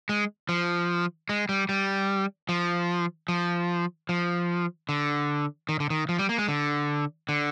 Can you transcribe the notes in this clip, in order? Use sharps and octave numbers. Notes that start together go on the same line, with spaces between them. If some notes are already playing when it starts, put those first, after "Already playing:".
G#3
F3
G#3
G3
G3
F3
F3
F3
D3
D#3
D3
D#3
F3
G3
A#3
G#3
D3
D3